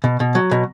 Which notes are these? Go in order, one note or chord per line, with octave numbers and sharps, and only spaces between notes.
B2
B2
F#3
B2